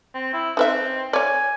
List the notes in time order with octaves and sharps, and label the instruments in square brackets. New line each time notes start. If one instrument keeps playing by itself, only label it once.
[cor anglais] C4
E4
[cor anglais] C4 [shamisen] D#4 B4 E5
[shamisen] C#5 D5 [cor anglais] G#5